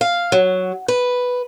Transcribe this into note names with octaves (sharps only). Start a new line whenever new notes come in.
F5
F#3
B4